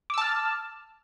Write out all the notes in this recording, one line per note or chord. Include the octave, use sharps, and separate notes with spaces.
A5 D6 E6 F6